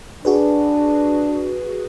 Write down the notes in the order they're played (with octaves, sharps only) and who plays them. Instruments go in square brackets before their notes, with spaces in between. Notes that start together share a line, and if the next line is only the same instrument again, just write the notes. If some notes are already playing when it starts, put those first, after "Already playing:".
[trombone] D4 [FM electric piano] F#4 G#4 B4